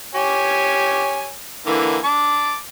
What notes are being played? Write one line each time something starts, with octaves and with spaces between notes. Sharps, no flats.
G4 C#5 G#5
D3 E3 A#3
A5 D6